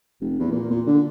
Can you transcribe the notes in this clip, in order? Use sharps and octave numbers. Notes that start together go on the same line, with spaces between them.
F1
E2
A#2
A#2
D3